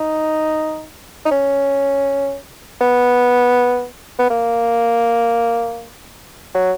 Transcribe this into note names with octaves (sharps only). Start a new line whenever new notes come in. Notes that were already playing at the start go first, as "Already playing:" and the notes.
Already playing: D#4
D#4
C#4
B3
B3
A#3
F#3